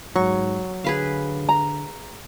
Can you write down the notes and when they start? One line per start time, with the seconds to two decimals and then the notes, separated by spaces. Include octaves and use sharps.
0.16 G#2 F#3 C#6
0.84 D3 G#4 B4 F5
1.49 A#5